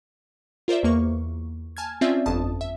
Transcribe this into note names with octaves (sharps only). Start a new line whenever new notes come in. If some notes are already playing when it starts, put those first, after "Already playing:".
F4 A#4 C5 D5 E5
E2 A#3 C#6
G#5 A5 F6 G#6
C4 C#4 F4 D5 E5
G1 F2 A5 D#6
E5